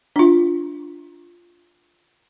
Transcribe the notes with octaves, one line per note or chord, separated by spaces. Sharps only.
D4 F4